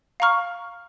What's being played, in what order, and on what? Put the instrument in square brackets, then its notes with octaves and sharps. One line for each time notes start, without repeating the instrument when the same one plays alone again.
[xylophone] F5 A#5 C#6 F6